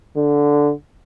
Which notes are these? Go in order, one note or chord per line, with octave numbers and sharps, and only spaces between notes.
D3